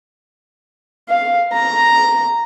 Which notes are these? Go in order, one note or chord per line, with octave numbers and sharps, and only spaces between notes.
F5
A#5